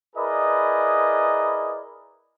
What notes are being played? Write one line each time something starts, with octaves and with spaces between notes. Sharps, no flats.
E4 G#4 A#4 B4 D5 D#5